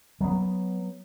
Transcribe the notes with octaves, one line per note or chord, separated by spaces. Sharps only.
F#3 B3